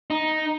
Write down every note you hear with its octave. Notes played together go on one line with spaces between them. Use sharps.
D#4